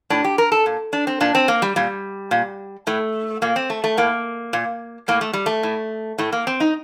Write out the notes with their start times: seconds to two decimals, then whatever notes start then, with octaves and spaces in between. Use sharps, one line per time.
0.10 A2 D4
0.24 G4
0.38 A#4
0.52 A4
0.66 A#2
0.93 D4
1.07 C4
1.21 A#2 D4
1.35 C4
1.48 A#3
1.62 G3
1.76 A#2 G3
2.31 A#2
2.87 A2 A3
3.42 A#2 A#3
3.56 C4
3.70 A3
3.84 A3
3.98 A2 A#3
4.53 A#2
5.08 A2 A#3
5.21 A3
5.33 G3
5.46 A3
5.63 A2
6.18 A2 A3
6.32 A#3
6.47 C4
6.60 D#4